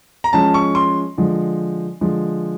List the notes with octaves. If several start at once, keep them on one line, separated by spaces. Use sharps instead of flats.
A#5
F3 G#3 C#4 A5
C#6
C6
D3 F3 G#3
D3 F3 G#3